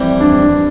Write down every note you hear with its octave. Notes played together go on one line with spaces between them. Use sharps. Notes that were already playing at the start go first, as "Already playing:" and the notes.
Already playing: F2 E3 G3 C4 E4
D4